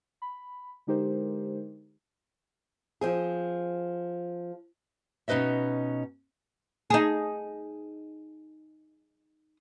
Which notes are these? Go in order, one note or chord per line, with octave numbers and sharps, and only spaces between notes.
B5
D3 G#3 D#4 G4 A#4 C5
F3 C4 G#4
B2 C#4 D#4 B4 D#5 E5
D#4 G#4